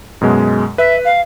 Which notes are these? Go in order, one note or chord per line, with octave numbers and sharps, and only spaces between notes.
F#2 B2 G#3
B4 E5
F5